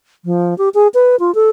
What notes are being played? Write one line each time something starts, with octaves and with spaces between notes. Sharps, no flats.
F3
G4
G#4
B4
F4
A4